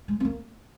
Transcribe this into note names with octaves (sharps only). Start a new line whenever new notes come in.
G#3
C4
A#3